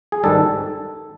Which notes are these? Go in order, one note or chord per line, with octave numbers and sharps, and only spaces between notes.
G#4
G#2 D#3 G3 A4